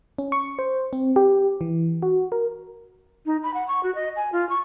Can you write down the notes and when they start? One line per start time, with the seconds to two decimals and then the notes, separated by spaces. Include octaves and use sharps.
0.18 C#4
0.32 C#6
0.59 C5
0.93 C4
1.16 G4
1.61 E3
2.02 F#4
2.32 A#4
3.26 D#4
3.43 B5
3.54 F#5
3.68 C#6
3.83 F#4
3.95 D#5
4.16 G#5
4.32 F4
4.49 C#6